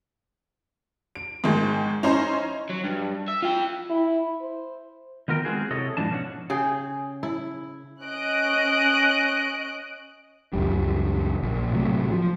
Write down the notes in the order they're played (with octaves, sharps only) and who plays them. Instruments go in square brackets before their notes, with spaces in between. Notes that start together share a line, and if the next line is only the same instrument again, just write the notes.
[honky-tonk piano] D7
G#2 D#3 G#3
C#4 D#4 E4 C5 A#5 C6
[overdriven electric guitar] F#3
G2
E5
F4 G5
[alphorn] E4
C5
[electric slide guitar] D#3 B3 F4 A#4 G5
G#3 C4 F4 F#4 G#4
C3 E4 A4 C#5 D#5
G#2 E3 F3 D4 A5
B2 C#4 G4 C#5 F#5
[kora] C#3 G#4 G5
E4
[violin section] C#4 D#5 F#6 D7
[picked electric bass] C#2 F#2 G3
A#1
A2 C3 F#3
F3